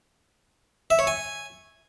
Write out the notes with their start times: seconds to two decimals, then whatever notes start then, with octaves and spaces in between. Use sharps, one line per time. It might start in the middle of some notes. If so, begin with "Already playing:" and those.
0.90 E5
0.99 C#5
1.07 G#5